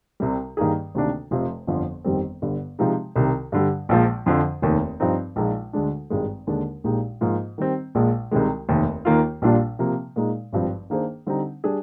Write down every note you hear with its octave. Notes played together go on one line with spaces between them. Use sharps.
C2 C3 G3
G2 D#3 A#3 D#4 G#4
D2 C3 D#3 A#3 D4
F1 F2 C3 F3
G1 F2 D3 F3
G1 F2 D#3 G3 C4
G1 G2 D3
C3 F3 G#3 D#4 G4
C2 C3 D#3
G2 D3 G3
A#1 A#2 F3 G#3
F2 D3 F3
F1 D#2 D#3
G2 F3 C4 D#4
A#1 A#2 F3 G#3 D#4
D2 D3 G#3 D4
G#1 G2 D#3 G#3
D#2 D3 G#3 D4
A#1 A#2 G#3 D#4 G4
G#2 F3 A#3 F4
D#3 G3 C4
A#1 A#2 G#3
C2 C3 D#3 G#3
F1 D#2 D#3
D#2 D#3 A#3 F4
A#1 A#2 G3 D4 F4
C3 F3 A#3
A#2 G#3 D#4
G#1 G2 F3 C4
D#3 A#3 D4 G#4 C5
D3 G3 C4 D#4
G3 D4 G#4